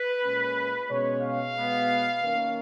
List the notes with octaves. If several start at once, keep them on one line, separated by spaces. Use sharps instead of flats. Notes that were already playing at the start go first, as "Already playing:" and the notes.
Already playing: B4
A#2 G#3 C#4
B2 G#3 C#4 C#5
F5
B2 G#3 B3
D#3 A#3 C#4